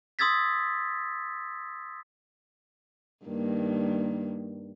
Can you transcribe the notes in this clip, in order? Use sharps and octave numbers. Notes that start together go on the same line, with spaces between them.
C6 D#6 E6 G#6 A6 B6
G2 D#3 A#3